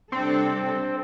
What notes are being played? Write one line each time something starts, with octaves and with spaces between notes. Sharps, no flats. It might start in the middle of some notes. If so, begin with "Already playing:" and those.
C3 G3 C4 D4 A4